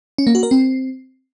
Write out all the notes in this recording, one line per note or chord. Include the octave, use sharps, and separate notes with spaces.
C#4
A#3
F#4
A#4
C4